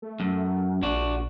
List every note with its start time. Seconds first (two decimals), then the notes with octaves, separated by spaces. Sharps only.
0.02 A3
0.20 F#2
0.83 A#1 D4 F#4